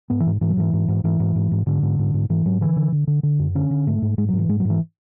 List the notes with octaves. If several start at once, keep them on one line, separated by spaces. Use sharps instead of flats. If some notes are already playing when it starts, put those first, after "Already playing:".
G#2 B3
E3
G#2
G#2 E3
F#3
G#2 E3
G#2
G#2
G#2 E3
G#2
G#2
G#2
G#2 D3
G#2
G#2
G#2
G#2 E3
G#2 F#3
D3 E3
D3
D3
D3
D3
F#2
D3 C#4
D3
G#2 A3
G#2
G#2 G#3
F#3
G#2
E3
G#2 G#3
F#3
G#2 E3